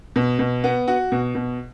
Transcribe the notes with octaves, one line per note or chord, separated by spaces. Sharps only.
B2
B2
B3
F#4
B2
B2